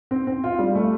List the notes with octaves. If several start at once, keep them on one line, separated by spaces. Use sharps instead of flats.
C4
C4
F4
G3
A3